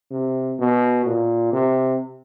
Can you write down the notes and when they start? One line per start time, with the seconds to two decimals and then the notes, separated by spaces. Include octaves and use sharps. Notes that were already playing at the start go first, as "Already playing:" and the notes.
0.11 C3
0.59 B2
1.05 A#2
1.53 C3